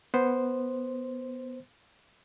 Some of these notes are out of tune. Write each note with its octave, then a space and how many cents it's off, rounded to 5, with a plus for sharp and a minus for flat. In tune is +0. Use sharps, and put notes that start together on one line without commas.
B3 +0 C5 +0